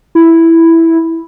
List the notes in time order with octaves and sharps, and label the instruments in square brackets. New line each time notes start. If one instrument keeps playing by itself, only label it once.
[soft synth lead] E4